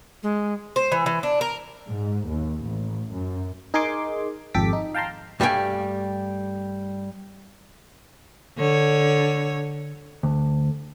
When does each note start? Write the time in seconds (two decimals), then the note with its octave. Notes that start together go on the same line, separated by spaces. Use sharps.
0.23 G#3
0.76 C5
0.92 E3
1.06 E3
1.23 D4
1.41 A#4
1.87 G#2
2.28 D#2
2.65 A1
3.12 F#2
3.74 D#4 G#4 A#4 G#5 C6 D6
4.54 G#1 F2 G4 A4 D6 B6
4.73 D#4
4.95 F5 G5 A5 A#5 C6
5.40 G2 G3 A3 F5 G5 G#5
8.57 D3 C#5
10.23 D2